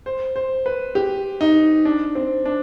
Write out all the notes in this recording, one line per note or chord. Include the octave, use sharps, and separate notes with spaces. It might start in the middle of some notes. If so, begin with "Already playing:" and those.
C5
C5
B4
G4
D#4
D4
C4
D4